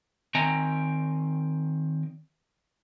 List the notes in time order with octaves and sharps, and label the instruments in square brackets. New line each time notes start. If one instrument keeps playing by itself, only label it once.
[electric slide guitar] D#3 C4 D#5 G5 G#5 A#5